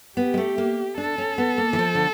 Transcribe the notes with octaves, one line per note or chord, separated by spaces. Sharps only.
B3 G4
G#3
A3
A#3
D4 A4
C#4
B3
A#3
E3
F3
D3